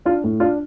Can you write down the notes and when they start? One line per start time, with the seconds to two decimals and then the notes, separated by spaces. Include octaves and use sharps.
0.05 D4 F4
0.24 A2
0.40 D4 F4